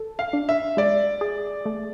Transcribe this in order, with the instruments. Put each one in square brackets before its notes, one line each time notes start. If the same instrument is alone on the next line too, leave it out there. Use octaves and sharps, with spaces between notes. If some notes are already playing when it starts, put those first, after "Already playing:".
Already playing: [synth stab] A4
[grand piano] F5
[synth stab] D4
[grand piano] E5
[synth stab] G#3 [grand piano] D5
[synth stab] G#4
A3